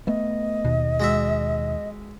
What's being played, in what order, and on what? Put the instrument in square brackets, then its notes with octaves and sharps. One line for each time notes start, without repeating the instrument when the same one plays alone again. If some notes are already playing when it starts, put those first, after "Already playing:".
[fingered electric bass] A3 B3 [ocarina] D#5
[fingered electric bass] D#2 [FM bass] B2
[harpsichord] G#3 F#4 E5